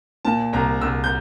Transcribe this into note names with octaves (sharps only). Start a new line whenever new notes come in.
A#2 A5
C2 A#5
C2 E6
G6